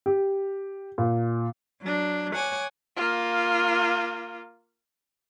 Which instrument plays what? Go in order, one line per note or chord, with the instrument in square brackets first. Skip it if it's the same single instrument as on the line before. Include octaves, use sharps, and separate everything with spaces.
[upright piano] G4
A#2
[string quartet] F#3 D4
C#5 F#5 G#5 D6
[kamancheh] A#3 F4